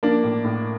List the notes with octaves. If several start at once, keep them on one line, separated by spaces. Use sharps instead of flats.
F3 A#3 D4
A2
A2